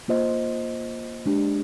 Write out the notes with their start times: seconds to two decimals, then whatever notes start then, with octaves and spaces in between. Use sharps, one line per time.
0.08 A#3 F4 C5 D#5
1.26 G#3 D4 G4